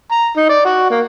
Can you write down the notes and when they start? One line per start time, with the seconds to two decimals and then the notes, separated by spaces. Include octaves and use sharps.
0.11 A#5
0.37 D#4
0.49 D5
0.65 F#4
0.90 A#3